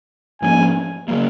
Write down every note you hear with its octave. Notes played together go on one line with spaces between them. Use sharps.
G#2 F3 A#3 C#4 G#5
C#3 F#3 A#3